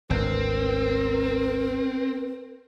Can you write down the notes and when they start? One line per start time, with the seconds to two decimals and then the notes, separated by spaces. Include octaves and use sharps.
0.10 G#1 D2 C4 A#4 B4